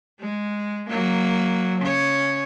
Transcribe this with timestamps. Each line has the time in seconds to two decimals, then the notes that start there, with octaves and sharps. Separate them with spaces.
0.20 G#3
0.90 F#3 A#3
1.82 C#3 C#5